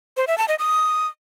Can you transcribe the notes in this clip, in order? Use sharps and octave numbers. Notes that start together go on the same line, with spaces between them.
C5
E5
A5
D#5
D#6